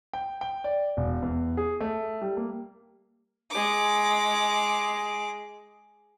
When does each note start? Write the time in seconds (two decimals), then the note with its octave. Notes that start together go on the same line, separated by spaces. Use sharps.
0.13 G5
0.41 G5
0.64 D5
0.97 E1
1.22 E2
1.57 G#4
1.81 A3
2.22 G3
2.37 A#3
3.51 G#3 D6